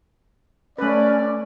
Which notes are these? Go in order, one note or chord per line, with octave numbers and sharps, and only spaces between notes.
A3 C#4 B4 D5